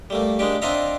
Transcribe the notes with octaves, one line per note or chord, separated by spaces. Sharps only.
G3 A3 A#3
G#3 A#3 D4 G4
C4 D4 F4 D#5 E5 A#5